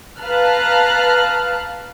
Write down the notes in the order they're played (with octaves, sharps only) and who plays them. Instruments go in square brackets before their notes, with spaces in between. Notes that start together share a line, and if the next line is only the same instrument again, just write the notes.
[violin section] B4 F5 A5 A#5 F6 F#6